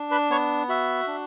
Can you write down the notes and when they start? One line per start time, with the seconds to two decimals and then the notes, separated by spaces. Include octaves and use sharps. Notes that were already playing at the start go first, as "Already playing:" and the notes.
Already playing: D4
0.11 B4
0.30 B3 C#5
0.69 F#4 E5
1.07 D4